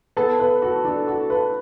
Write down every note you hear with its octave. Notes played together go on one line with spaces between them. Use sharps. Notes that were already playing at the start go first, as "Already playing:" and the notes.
B3 A4
B4
F#4
D4
F#4
B4